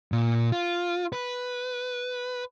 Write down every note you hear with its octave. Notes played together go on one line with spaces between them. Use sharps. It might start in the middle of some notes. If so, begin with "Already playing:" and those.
A#2
F4
B4